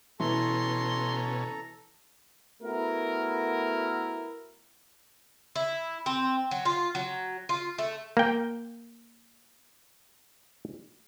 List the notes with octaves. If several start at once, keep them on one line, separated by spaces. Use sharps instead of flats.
B2 E3 C#4 A4 A#5 C6
A3 B3 E4 F#4 A#4
E4
C4
F#3
F4
F#3
F4
A3
A#3 G5